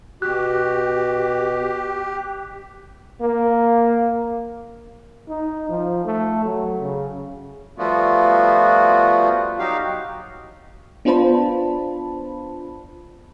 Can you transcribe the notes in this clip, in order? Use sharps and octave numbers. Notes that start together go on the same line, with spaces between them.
B2 F#4 G4 F#6
A#3
D#4
F3
A3
F#3
C#3
F3 G3 A3 B3 F4 F#4
F#3 D#4 F#4 G4 F5
B3 D4 F4 C5 A5 B5